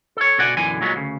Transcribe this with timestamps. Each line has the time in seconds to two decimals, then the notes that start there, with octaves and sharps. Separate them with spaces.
0.17 A4 C#5
0.38 B2 D3 F#4 D5 F#5 G#5
0.57 B1 F#2 D3 E3 G#5
0.81 A#2 F#3 G#3 B3
0.96 D2 C#3